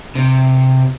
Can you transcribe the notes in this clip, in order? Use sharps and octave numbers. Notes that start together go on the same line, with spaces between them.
C3